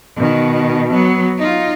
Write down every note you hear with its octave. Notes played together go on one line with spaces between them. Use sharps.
B2 D#3
F#3 B3
D#4 F4